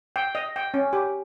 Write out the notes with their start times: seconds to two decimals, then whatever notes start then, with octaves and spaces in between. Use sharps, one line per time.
0.16 G5
0.35 D#5
0.56 G5
0.74 C#4
0.93 G4